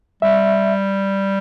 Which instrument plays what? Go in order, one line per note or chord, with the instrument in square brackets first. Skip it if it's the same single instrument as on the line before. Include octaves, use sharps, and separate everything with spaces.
[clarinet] G3 [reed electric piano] E5